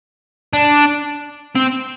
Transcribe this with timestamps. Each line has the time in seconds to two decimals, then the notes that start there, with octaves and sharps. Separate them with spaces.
0.53 D4
1.56 C4